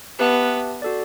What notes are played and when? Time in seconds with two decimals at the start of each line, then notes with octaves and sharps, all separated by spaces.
0.19 B3 G4 B4 E5 A5
0.82 F#4 A4 D5